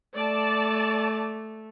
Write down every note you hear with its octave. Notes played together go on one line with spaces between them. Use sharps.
A3 D5 A5